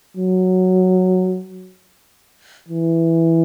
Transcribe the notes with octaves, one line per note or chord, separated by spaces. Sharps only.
F#3
E3